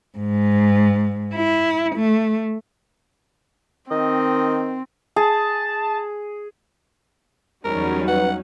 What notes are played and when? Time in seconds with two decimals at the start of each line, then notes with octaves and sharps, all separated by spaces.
0.18 G#2
1.34 E4
1.96 A3
3.91 D#3 C4 D#5
5.16 G#4 A5
7.65 E2 F#3 G3 C#4 D#4 F#4 A#4
8.08 B4 F#5